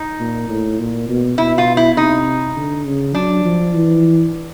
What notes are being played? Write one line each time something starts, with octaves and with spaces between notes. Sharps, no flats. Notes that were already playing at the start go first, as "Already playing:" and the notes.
Already playing: D#4
A#2
A2
A#2
B2
B2 E4
F4
E4
C3 D#4
D3
C#3
F#3 D4
F3
E3